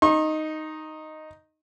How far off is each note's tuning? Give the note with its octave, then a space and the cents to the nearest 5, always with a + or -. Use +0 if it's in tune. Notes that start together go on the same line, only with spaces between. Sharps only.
D#4 +0 C#6 -45